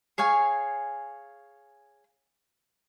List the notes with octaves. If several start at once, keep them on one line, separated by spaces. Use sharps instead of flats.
G#4 C#5 F5 G#5